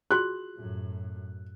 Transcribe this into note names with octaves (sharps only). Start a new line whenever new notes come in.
F4 F#4 G#4 F#6
F#2 A2